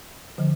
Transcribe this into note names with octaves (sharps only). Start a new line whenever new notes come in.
D3 F3